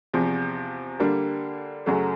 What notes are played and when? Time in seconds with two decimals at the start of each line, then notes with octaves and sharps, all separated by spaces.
0.13 E2 C3 F3
1.00 D3 G3 A#3 D4
1.86 F#2 C#3 F#3 A3